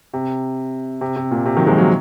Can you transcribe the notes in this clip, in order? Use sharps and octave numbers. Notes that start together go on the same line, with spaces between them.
C3
C3
C3
A#2
C3
D#3 F#3
F3 G#3
F#3 A#3